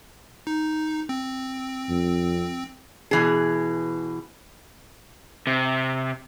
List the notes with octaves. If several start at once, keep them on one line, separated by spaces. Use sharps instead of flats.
D#4
C4
F2
B2 E3 G#4
C3